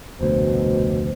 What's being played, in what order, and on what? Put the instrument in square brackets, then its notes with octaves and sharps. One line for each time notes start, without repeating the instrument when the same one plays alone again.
[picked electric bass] F1 D2 [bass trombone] B2 [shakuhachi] C5